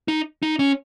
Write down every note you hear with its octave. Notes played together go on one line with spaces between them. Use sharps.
D#4
D#4
C#4